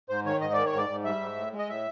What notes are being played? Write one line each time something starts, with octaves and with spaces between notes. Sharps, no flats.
G#2 C5
D#3 C#5
G#2 D#5
D#3 D5
C#5
G#2 D5
G#2
G3 E5
G#2
A2
G#3
D#5
A2 E5